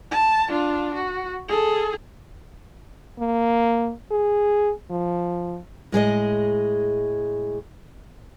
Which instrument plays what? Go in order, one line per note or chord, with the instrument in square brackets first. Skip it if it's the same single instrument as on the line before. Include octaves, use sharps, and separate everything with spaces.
[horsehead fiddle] A5
D4 F4
F#4
G#4 A4
[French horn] A#3
G#4
F3
[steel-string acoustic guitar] A2 G#3 G#4 D#5